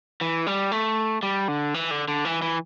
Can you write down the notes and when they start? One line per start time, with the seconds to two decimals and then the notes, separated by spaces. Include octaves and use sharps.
0.21 E3
0.47 G3
0.72 A3
1.23 G3
1.48 D3
1.74 E3
1.91 D3
2.08 D3
2.25 E3
2.42 E3